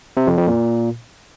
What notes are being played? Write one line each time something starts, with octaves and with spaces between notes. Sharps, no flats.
C3
F2
F2
A#2